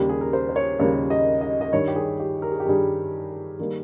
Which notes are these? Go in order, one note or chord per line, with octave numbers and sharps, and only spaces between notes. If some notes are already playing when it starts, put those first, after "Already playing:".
Already playing: D#2 C#3 G3 A#3 G4
G#4
A#4
C5
C5
C#5
D#2 C#3 G3 A#3 C#5
D#5
D#5
D#5
G2 D#3 G3 C#5
G4
G#4
G4
A#4
G#4
G4
G2 D#3 G3 G#4
D#3 G3 A#3